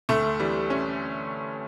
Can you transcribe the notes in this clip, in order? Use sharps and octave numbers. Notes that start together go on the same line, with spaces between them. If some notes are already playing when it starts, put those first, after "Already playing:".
D2 A3
E3 G3
C#4